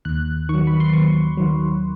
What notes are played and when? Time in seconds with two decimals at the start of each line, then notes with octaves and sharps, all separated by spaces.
0.05 D#2 F#6
0.49 D#3 C#6
0.54 F#3
0.67 B5
0.80 C6
0.93 D#2 C#6
1.37 D#3 F#3